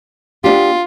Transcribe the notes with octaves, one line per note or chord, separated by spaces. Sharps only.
B3 D4 F4 G4